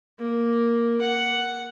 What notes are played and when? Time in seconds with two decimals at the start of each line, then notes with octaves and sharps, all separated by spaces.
0.19 A#3
1.01 F#5